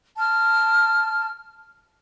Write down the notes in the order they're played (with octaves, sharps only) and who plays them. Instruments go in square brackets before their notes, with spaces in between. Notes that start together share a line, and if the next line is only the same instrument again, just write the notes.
[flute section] A5 F6